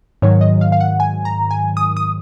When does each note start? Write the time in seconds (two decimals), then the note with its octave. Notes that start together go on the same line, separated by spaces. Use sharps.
0.22 G#2 D#3 F#3 C#5
0.41 D#5
0.61 F5
0.72 F5
0.80 F#5
1.00 G#5
1.25 A#5
1.51 G#5
1.77 D#6
1.97 D#6